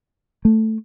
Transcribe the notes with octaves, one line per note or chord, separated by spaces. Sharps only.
A3